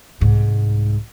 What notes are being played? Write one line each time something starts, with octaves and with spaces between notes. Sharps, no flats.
C2 G#2